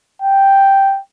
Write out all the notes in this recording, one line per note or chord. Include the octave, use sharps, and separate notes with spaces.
G5